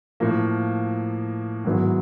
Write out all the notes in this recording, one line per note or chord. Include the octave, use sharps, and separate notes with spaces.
A2 F3 A#3
G#2 D#3 F#3 B3 E4